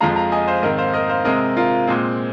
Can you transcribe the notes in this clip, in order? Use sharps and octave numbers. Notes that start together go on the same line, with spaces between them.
F2 F3 G#3 F5 A#5
F5 A#5
D#5 G#5
C5 F5
G#2 D#3 C4 A#4 D#5
C5 F5
A#4 D#5
C5 F5
C3 G#3 C4 A#4 D#5
F4 A#4
A#2 G#3 C4